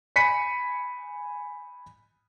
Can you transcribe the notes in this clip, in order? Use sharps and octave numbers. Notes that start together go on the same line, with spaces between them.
G#5 B5 B6 C#7 D#7